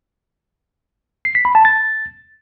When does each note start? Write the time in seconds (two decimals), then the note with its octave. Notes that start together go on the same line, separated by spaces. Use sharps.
1.25 C7
1.35 B6
1.45 B5
1.55 A5
1.65 A6